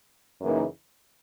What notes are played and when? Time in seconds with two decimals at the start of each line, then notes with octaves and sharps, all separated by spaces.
0.41 F#2 C#3 E3 A#3 D#4